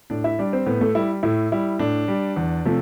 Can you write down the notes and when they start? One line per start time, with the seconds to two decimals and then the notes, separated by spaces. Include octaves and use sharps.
0.10 A2 D4 D5
0.24 E4 E5
0.39 G3 D4 D5
0.53 C4 C5
0.66 A2 B3 B4
0.81 A3 A4
0.95 G3 E4
1.23 A2 E4
1.52 G3 E4
1.79 A2 D4
2.08 G3
2.36 E2
2.65 C3 F3 A3